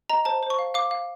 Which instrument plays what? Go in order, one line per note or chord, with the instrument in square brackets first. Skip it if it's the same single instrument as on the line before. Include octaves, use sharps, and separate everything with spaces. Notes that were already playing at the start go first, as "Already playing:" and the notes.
[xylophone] D#5 A#5
C5 A5
C5
C#6
F5
F5 D6
F5